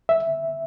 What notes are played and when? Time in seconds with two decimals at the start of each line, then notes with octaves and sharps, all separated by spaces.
0.09 E5